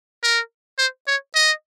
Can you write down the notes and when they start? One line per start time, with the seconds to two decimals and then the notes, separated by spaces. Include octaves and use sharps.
0.23 A#4
0.78 C5
1.07 C#5
1.35 D#5